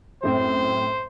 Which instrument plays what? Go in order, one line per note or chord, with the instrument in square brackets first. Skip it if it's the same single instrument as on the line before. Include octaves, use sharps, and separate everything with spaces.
[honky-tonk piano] F#2 A2 C4 [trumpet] C5